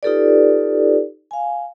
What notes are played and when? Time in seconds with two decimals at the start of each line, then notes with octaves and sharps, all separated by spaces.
0.03 D#4 F4 G4 A4 B4 D5
1.31 F5 G#5